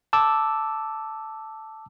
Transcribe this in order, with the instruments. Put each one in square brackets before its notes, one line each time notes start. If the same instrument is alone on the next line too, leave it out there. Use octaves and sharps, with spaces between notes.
[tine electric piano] A5 D6 E6